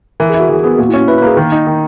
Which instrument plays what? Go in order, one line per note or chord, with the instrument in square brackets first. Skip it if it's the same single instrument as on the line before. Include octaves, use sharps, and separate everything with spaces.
[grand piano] E3 [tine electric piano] A#4
[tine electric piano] G#4
[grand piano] E4
[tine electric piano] F#4
[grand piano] E3 [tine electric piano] G#4
[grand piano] B3 [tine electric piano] G#4
[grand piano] A#2 [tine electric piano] F#4
[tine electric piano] E4
[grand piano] C#4
[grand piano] E4 [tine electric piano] B4
[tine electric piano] B4
[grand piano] A#3 [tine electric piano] G#4
[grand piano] D#3
D#4
D#3